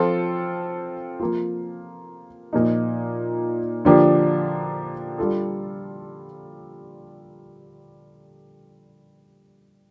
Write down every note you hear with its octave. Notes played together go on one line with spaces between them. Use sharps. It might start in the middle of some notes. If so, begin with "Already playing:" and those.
Already playing: F3 C4 F4 A4
F3 A#3 F4
A#2 F3 A#3 D#4
D3 F3 A#3 D4 G4
G3 D4 F4 A4